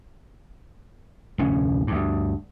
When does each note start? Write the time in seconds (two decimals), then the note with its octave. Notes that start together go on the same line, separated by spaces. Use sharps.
1.38 F1 D2 A2 C#4
1.87 D2 G2